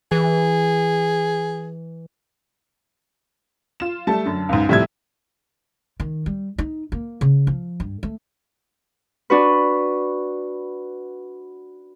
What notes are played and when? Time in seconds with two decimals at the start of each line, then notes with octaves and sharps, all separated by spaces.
0.12 E3 G#4
3.80 F4 E7
4.07 G3 A3 A5
4.25 F#2 D3
4.49 C#2 G#2
4.69 A2 C3 F3 G3 E5 G#6
6.00 D#3
6.26 G3
6.58 D#4
6.92 A#3
7.21 C#3
7.47 F3
7.80 G2
8.03 A3
9.30 D4 F#4 B4